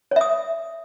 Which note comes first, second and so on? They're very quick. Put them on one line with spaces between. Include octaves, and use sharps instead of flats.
C#5 E5 D#6